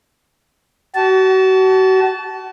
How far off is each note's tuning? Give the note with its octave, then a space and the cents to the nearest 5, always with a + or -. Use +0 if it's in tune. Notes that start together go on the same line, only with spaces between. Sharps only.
F#4 +35 A5 -15